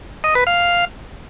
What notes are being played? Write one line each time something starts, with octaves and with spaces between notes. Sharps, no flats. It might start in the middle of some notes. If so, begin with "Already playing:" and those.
D#5
B4
F5